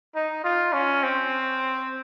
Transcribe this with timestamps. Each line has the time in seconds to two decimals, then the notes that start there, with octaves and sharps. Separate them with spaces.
0.15 D#4
0.44 F4
0.73 C#4
1.03 C4